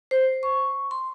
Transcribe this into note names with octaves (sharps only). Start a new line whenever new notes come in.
C5
C#6
C6